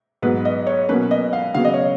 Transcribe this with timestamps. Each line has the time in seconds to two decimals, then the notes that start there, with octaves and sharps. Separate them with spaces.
0.22 G#2 F#3 B3 B4
0.45 D#5
0.67 C#5
0.89 B2 F#3 A#3 C#4 B4
1.11 D#5
1.33 F5
1.54 C#3 F#3 B3 F5
1.65 D#5
1.74 C#5